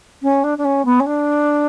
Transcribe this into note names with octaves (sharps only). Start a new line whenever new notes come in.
C#4
D4
D4
C#4
B3
C#4
D4